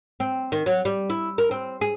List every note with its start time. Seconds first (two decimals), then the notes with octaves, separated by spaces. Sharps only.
0.20 C4
0.52 D#3
0.66 F#3
0.85 G3
1.10 E4
1.38 A#4
1.51 C4
1.81 G#4